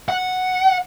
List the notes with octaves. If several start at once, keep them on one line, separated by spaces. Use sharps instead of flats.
F#5